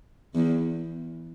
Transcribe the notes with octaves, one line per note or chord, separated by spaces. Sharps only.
E2